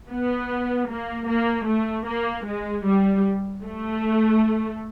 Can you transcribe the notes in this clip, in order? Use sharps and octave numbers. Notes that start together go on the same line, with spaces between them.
B3
A#3
A#3
A3
A#3
G#3
G3
A3